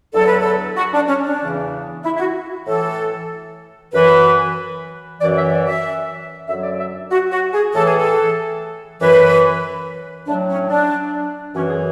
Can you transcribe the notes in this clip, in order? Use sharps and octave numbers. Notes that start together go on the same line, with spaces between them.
E2 D3 F#3 A4
B4
A4
F#4
D4
C#4
D4
E2 C#3 E3
E4
E4
F#4
A2 E3 A4
F#2 E3 B4
F#2 E3 D5
E5
D5
E5
F#2 D3 F#3 E5
D5
E5
F#4
F#4
G#4
A2 E3 A4
G#4
A4
F#2 E3 B4
A2 F#3 D4
C#4
D4
F#2 E3 C#4
G#4